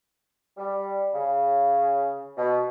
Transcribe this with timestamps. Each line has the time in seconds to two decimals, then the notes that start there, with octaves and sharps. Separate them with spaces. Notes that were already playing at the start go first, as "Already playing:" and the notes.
0.58 G3
1.14 C#3
2.37 B2